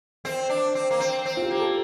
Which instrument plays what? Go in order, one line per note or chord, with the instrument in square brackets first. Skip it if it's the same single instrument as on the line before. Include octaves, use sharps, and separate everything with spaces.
[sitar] C4 [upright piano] C5
[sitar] D4
C4
A#3
C4
C4
[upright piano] F4
G4
[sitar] A#3
[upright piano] A4